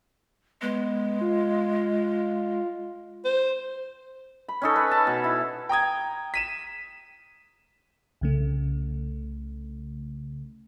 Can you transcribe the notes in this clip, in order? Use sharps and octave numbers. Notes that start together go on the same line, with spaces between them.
G#3 B3
F4
C5
B5
C#4 D#4 A4
B4
A5
B2
E4
G5 A#5 D#6 G#6
B6 D#7 E7
C2 C#3 A3